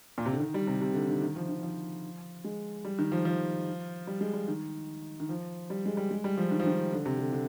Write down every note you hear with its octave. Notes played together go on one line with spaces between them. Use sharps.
A#2
C3
D3
D#3
G3
C3
C3
D3
D#3
D#3
F3
D#3
F3
G#3
G3
D#3
F3
F3
G3
G#3
G3
D#3
D#3
F3
G3
G#3
G3
G#3
G3
F3
D#3
F3
D#3
D3
C3
D3
D3